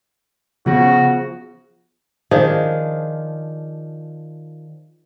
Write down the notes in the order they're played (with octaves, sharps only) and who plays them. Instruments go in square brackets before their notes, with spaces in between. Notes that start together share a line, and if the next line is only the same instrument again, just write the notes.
[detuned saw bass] C#3 [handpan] F3 [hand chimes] B3 F4 G#4 [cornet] F#4
[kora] D#3 F3 D4 G#4